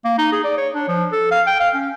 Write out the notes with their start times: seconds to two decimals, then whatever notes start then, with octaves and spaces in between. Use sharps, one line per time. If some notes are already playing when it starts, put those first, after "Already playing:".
0.05 A#3
0.18 D#4
0.32 G#4
0.44 D5
0.57 C#5
0.74 D4
0.88 F3
1.12 A4
1.31 F5
1.47 G5
1.60 F5
1.74 C#4